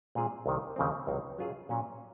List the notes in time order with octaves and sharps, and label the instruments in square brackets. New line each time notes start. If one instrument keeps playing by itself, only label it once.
[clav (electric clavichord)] A#2 G#3 C4 F4 G#4
C2 C3 D#3
D#2 C#3 F3 C4
C#2 C3 F#3 C4 D#4
F#3 C#4 F4 G#4
A#2 F#3 C#4